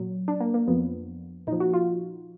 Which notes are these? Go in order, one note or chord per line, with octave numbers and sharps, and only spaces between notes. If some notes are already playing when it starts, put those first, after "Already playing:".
Already playing: A#2 F#3
D4
A#3
A#3
F2 F3 B3
A#2 F3 D#4
F#4
F4